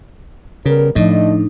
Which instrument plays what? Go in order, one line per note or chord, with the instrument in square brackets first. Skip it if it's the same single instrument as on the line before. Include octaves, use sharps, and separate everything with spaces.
[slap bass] C#3 [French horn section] G3 B3 A#4
[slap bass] A2 [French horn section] D3 A3 D#5 [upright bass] F3 [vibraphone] D4 D#4